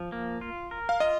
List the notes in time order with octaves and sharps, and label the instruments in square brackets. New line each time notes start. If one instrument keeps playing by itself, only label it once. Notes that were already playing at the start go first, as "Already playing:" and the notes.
Already playing: [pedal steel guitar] F3
A#3
F4
A#4
[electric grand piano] F5
[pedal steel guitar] F4 [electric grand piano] D#5